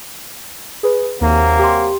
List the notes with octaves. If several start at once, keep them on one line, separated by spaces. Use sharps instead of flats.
G#4 B4
D#2 C3 F#3 A#3
G4 C6